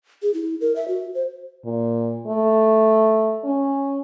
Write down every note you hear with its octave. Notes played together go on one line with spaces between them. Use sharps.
G#4
E4
A#4
E5
F#4
C5
A#2
A3
C#4